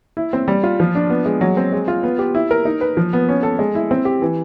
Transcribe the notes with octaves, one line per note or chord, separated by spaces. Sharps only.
E4
C4
G3
F4
F3
D4
B3
G#3
F#3
C4
G#3
F4
B3
G4
E4
A#4
D#4
B4
F3
B3
C#4
A4
G#3
E4
C4
G4
E3